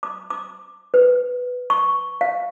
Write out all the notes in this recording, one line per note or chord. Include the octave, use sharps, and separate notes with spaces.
D6
D6
B4
C#6
F5